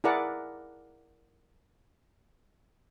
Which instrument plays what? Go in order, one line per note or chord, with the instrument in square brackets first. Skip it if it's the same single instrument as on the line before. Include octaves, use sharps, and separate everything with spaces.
[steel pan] E4 G#4 A#4 D5 F#5